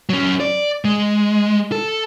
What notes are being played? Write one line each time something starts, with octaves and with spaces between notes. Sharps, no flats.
F#3 C#4
D5
G#3
A4